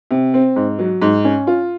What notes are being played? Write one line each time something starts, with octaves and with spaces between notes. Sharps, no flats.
C3
C4
G#2
F#3
G#2
C#4
F4